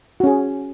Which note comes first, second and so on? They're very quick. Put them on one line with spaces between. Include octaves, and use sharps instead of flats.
F#4 C#4 G#4